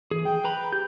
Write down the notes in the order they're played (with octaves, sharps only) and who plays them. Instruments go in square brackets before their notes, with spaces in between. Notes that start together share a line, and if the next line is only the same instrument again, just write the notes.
[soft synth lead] E3 [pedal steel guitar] G#4
[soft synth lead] G5
[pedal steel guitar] B4 A#5 B5
[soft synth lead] G4 [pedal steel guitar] G6